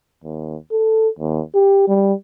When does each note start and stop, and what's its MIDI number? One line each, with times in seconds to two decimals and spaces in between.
0.24 0.56 39
0.71 1.09 69
1.19 1.41 39
1.55 1.84 67
1.88 2.13 55